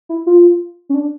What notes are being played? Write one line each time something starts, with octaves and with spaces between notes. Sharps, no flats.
E4
F4
C#4
D4